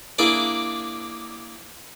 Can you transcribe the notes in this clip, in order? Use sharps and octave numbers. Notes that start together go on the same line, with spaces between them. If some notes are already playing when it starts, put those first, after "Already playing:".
A#3 D4 E4 G#4 D5